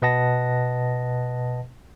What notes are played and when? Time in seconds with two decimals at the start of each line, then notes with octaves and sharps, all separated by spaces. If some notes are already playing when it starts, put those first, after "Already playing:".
0.02 B2 B4 D#5 F#5 A5 A#6